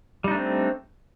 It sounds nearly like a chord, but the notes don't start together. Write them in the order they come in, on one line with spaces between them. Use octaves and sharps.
G3 D#4 D4 A3 C4